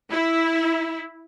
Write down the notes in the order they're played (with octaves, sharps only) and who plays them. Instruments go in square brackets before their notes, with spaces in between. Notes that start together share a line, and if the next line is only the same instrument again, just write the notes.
[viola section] E4